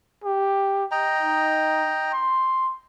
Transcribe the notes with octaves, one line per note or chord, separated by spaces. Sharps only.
G4
D#5 G5 A#5
D#4
C6